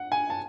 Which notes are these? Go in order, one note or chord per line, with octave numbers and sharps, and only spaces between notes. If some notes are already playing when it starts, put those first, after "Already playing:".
Already playing: F#5
G#5
A5